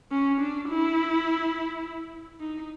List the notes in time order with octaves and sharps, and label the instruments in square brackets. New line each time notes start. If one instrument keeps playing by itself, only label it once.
[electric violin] C#4
D4
E4
D#4